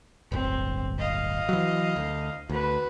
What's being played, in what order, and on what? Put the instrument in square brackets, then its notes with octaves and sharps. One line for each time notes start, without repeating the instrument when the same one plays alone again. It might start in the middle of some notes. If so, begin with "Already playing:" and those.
[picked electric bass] D1 G1 [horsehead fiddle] C4
[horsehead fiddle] D#5 F5
[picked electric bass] E3 F#3
D2
[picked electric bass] D2 [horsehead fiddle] F#4 B4